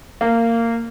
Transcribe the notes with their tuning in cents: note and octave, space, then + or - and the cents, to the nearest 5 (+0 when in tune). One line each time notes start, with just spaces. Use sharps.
A#3 -20